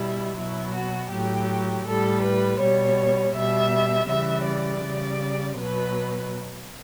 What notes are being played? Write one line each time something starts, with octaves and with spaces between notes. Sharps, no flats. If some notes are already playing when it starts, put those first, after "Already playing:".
Already playing: B2 G3 E4
B2 F#3 E4
F#4
A2 F#3 G4
A2 G3 A4
B4
B2 G3 C#5
B2 G3 E5
C#3 E3 G3 E5
D5
C#3 G3
B2 F#3 B4